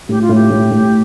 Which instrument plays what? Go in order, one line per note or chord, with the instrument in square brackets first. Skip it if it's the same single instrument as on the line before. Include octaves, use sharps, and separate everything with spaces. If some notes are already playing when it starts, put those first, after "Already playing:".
[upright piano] A2 [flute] G4
[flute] F4
[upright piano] A2
[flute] G4
[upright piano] A2
A2